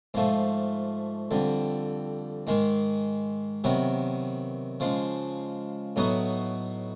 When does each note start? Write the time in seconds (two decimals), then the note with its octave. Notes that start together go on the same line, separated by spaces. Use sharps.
0.14 G#2 F3 A3
1.31 F2 D3 G3
2.47 G#2 D#3 G#3
3.64 C3 D#3 F#3 B3
4.80 C#3 F3 G#3
5.96 A2 F#3 B3 D#4 F#4